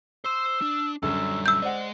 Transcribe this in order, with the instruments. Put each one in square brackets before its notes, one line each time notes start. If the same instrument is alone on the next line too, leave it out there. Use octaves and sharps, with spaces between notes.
[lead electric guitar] C5 C6 [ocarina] E6
[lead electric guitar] D4
[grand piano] F#2 D3 [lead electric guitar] G3 C#4 [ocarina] E6
[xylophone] E6 G6
[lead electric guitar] G#3 D#5 [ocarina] C5 [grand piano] D5 F#5